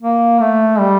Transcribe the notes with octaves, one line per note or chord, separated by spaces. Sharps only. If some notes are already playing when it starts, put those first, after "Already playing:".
A#3
A3
G3